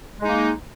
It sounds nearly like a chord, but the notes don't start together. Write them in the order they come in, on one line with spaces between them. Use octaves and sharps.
G#3 D#4 A#3